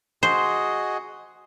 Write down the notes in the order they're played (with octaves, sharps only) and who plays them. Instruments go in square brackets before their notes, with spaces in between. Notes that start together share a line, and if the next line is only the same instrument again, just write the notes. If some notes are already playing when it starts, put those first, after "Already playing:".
[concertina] F#4 G#4 D#5 [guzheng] C5